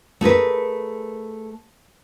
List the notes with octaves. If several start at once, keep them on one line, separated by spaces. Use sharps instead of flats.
A3 G#4 A#4 B4